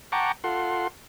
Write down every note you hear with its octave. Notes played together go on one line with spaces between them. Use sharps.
F#5 G5 A5 A#5 C#6 D6
F4 A4 F#5 C6